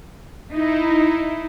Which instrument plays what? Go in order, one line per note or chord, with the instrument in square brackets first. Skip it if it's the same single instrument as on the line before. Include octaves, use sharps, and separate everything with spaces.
[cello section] D#4 E4